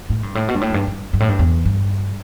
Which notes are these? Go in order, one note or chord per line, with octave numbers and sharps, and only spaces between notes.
A2
G2
A2
B2
G2
A2
E2
G2
G2
G2
A2
G2
E2
G2